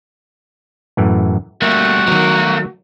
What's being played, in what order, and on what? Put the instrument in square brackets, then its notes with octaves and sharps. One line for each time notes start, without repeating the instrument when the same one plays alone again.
[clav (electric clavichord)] F#2 A2 E3
[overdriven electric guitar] G3 A3 [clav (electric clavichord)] A#3 E5 [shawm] F#4
[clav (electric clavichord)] D#3 F#3 [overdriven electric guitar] A3 A#4